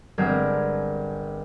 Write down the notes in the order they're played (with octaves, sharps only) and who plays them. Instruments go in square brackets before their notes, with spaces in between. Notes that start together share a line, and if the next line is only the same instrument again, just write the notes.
[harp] G1 G3 G#3 C4 A#4 G#6